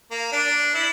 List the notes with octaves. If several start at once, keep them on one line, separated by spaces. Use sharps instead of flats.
A#3
D4
E4